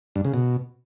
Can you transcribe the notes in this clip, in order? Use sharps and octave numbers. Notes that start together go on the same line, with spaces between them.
G2
C#3
B2